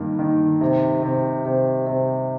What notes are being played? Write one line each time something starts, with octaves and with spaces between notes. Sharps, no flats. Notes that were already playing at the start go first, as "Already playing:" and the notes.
Already playing: G2 D#3 A#3
D#3
C3
C3
C3
C3